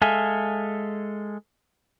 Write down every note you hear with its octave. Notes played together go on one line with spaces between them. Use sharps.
G#3 A4 E5 F5 G#5